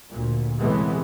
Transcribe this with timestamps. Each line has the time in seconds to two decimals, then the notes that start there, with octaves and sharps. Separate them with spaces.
0.11 D2 A#2
0.59 A2 C3 E3 G#3 A3 B3